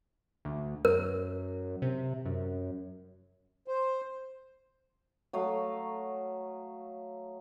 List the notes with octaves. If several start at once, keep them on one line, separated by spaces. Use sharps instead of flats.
D2
F#2 A#4
C3
F#2
C5
F#3 A3 D#5 F5